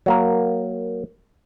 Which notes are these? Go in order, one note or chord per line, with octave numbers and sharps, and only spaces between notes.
F#3 A#3 A#4